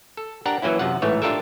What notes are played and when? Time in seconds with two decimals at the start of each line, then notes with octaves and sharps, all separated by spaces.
0.17 A4
0.46 D4 G4 A#4 F#5 A#5
0.62 E3 F#3 A#3 C#4 E4
0.79 F#2 C3 F4 F#5
1.02 A1 G#2 E3 A3 C#5
1.22 D4 F4 G4 A4 A#4 E5